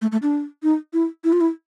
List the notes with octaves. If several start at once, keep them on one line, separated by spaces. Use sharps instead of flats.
A3
A3
D4
D#4
E4
E4
F4
E4